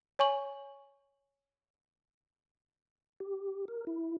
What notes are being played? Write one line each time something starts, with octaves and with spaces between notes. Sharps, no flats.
C#5 G#5 C#6 F#7
G4
A#4
E4